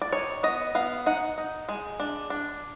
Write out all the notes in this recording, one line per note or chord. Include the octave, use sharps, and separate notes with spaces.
D5
D#3 C#5
B3 D#5
B3 F5
D#4 F#5
D#4
G#3
D4
D4